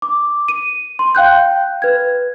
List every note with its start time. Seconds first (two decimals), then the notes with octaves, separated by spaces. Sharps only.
0.02 D6
0.48 D#7
0.99 C6
1.15 F5 G5 F#6 G6
1.82 B4 G#6